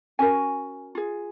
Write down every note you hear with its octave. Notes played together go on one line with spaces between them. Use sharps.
C#4 F#4 A#4 G#5
F4 G#4